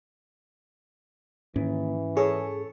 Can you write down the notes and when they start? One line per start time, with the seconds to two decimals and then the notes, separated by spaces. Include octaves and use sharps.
1.56 D#2 G#2 E3 C#4
2.17 G#4 A4 C#5